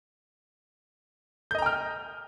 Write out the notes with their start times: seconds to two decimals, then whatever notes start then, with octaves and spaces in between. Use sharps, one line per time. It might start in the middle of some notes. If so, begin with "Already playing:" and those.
1.51 G6
1.55 D#5
1.58 A#5
1.62 G5
1.66 F6